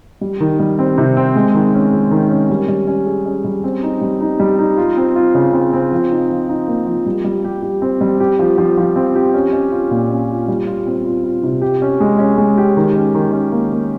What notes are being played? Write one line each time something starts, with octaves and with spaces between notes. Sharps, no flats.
G3
D#3
G3
C4
C3
C4
G#3
D#3
C#4
G#3
D#3
C#4
G3
G3
C#4
G#4
C#4
G3
C4
D#4
G3
D#4
G3
D#4
F4
C4
F4
C#3
C4
C4
F3
D#4
F3
D#4
A#3
F3
G3
G3
G4
G4
C4
G3
G4
F3
F3
F3
C4
G4
C#4
C#4
F4
A#2
C#4
F4
G3
F4
C4
F4
F4
C3
G4
C#4
G#3
C#4
G#3
G4
D#3
C#4
D#3
C#4
A#3
A#3